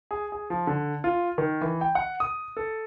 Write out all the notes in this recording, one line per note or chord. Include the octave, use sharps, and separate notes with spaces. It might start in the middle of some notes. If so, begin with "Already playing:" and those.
G#4
G#4
F3
D3
F4
D#3
E3
G5
F#5
D#6
A4